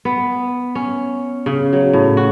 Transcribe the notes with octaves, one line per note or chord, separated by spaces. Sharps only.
B3
C#4
C#3
F#3
A2
F#4